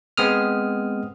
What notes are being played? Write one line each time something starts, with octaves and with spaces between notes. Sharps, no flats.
G#3 B3 C4 D#6 F6